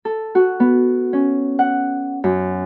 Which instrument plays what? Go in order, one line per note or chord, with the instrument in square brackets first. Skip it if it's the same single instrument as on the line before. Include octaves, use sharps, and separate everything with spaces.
[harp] A4
F#4
B3
C#4
F#5
F#2